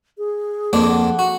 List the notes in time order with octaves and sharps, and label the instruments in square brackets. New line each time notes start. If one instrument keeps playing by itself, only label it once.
[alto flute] G#4
[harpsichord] F2 A#3 D4
[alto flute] F#5
[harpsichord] F#4